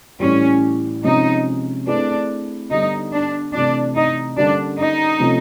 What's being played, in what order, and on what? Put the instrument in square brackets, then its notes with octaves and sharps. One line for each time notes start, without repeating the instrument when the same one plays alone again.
[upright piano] A2 E3 G3 [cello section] C#4
[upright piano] C3 F3 G#3 C#4 [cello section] D#4
[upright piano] A3 C4 E4 G#4 B4 [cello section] D4
[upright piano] D3 G3 B3 [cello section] D#4
[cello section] D4
[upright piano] C3 E3 A3 [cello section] D4
[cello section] D#4
[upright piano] D3 G3 A#3 C#4 [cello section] D4
[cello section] D#4
[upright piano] C3 F3 A3 C#4 F4